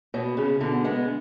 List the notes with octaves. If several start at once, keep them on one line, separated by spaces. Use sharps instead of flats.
B2 C#5
C#3 G#4
B2 D3 B3
G#3 B3 D4